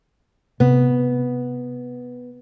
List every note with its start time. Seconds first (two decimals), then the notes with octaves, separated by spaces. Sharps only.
0.60 C3 B3